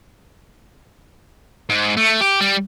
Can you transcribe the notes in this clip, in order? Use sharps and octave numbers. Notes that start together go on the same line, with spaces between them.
G#2
A3
G4
G3